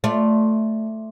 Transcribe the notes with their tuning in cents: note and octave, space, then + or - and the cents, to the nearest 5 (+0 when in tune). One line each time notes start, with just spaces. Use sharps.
A3 +0 F4 +5 D5 +5